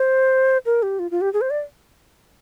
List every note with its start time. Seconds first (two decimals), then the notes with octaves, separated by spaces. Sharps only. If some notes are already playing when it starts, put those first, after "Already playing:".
Already playing: C5
0.66 A#4
0.83 G4
0.99 F4
1.11 F4
1.21 G4
1.33 G#4
1.41 C5
1.50 D5